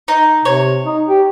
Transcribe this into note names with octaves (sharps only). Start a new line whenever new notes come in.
D#4
C3 C#5
D#4
G4